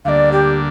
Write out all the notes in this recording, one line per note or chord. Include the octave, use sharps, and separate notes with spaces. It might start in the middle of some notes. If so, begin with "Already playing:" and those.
D2 D3 G3 A#3 D4 D5 F5
G4